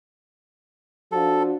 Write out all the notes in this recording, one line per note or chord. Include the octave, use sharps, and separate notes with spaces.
F3 D4 F#4 A4